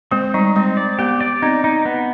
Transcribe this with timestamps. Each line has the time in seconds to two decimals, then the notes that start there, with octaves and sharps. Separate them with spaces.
0.11 G#3 C4
0.34 G3 D#4
0.56 G#3 C4
0.77 D5
0.99 B3 G4
1.21 D5
1.42 C4 D#4
1.64 D#4
1.85 B3